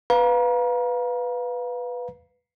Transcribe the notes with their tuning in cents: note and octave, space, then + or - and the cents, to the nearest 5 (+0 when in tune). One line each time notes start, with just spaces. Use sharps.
B4 +0 F5 +15 A#5 +35